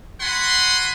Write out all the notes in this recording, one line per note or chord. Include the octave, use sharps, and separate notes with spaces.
F#4 F#5 G#5 B5 C6